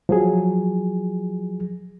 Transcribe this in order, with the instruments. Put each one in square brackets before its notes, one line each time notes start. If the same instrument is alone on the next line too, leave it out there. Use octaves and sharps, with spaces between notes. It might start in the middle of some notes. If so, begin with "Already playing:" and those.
[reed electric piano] F3 F#3 G#4